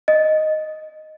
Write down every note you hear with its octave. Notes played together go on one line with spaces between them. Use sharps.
D#5